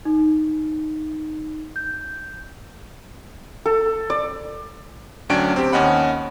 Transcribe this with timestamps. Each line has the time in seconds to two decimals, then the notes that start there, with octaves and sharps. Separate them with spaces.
0.05 D#4
1.76 G6
3.66 A4
4.10 D5
5.29 D2 F#3 C#4 D4 G5 D7
5.56 C4 G4
5.73 D#2 C#4 D#5 F#5 B5